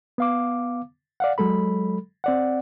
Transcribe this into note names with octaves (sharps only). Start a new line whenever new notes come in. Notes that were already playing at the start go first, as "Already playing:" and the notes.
B3 F5 D6
D5 F5 F#5
F#3 G#3 A4 B5
C4 D5 F#5